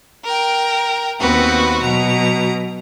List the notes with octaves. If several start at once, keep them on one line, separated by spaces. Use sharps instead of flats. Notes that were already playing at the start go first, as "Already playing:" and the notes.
A#4 G5
D#2 B3 C4 F#4 B4
B2 F#3 A#5